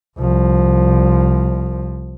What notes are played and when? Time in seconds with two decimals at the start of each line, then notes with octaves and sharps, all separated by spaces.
0.18 C2 F3